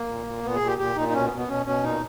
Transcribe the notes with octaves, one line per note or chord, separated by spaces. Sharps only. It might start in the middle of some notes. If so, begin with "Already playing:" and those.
Already playing: A#3
A#2
A#2
A#2 B3
G#4
A#2
G4
A#2 G4
A#2 D#4
D#4
B2 C#4
B3
B2
B3
B2 C#4
B2 C#4
A#2 D#4